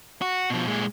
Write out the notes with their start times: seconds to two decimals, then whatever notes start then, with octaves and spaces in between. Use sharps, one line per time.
0.22 F#4
0.50 B2 F3
0.67 A#2 G#3